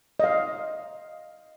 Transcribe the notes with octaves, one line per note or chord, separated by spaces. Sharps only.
D#5 F5